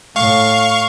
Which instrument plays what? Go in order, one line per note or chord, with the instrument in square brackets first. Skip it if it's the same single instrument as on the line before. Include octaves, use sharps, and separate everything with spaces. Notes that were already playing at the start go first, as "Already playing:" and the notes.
[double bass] A2 [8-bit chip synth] F5 C#6